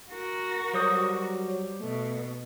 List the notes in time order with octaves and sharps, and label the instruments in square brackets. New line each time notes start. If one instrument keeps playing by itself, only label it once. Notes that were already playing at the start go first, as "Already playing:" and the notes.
[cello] F#4 A#4
[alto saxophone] F#3 [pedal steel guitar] G3 C5 D#6
[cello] B2 [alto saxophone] A3